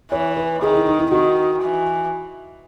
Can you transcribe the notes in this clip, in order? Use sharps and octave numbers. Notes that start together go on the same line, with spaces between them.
E3 C#5
B4
D#3 G#4
E4
D#4
E4
D#3 F#4
E3